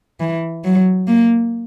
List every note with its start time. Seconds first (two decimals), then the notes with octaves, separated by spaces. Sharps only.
0.20 E3
0.64 F#3
1.07 A#3